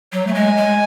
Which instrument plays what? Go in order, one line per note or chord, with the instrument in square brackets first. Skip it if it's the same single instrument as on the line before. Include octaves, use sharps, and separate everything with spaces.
[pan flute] F#3
A3
[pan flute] G#3 [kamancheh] G#5
[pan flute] G#3